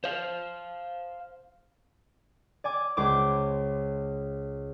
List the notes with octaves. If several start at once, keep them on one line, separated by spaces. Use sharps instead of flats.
C5 F5
D5 G#5 D6
C#2 C5 D6